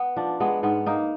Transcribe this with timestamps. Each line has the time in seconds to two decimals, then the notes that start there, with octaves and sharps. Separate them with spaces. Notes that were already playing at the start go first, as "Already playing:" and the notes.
Already playing: B3
0.16 F3 D4
0.40 G#3 B3
0.63 G#2 B3
0.86 A#3 D#4